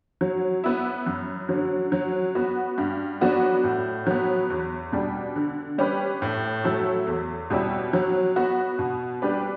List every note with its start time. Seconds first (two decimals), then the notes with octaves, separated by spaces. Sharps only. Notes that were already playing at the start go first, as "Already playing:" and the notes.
0.21 F#3
0.64 B3 E4
1.06 F#2
1.49 D3 F#3
1.92 F#3
2.35 B3 F#4
2.78 G2
3.21 F#3 B3 D4 F#4
3.64 A2
4.07 F#3 B3
4.50 E2
4.92 B2 G3 D4
5.36 D3
5.78 G3 C#4 G4 B4
6.22 A2
6.64 F#3 A3 E4 A4
7.07 E2
7.50 B2 G3 C#4 E4
7.93 F#3
8.36 B3 F#4
8.79 B2
9.22 G3 D4 G4 B4